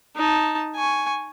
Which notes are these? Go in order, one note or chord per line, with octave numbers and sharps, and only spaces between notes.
D#4 A5
G#5 C#6